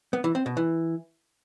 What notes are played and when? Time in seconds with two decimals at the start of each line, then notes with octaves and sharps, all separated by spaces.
0.13 B3
0.24 E3
0.35 C4
0.46 B2
0.57 E3